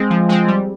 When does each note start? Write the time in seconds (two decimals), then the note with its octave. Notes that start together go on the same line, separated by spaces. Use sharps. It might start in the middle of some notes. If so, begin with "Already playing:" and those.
Already playing: G#3 C4
0.10 F3
0.29 G#3 C4
0.48 G3